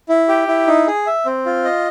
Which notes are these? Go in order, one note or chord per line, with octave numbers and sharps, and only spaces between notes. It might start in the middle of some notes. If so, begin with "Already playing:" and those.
E4
G4
E4
D#4
G#4
E5
C4
F4
D#5